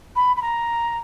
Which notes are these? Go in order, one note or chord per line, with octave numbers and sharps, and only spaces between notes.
B5
B5
A#5